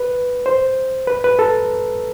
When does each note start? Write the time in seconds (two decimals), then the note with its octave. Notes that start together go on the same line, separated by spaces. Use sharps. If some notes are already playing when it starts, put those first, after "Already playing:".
Already playing: B4
0.46 C5
1.08 B4
1.24 B4
1.39 A4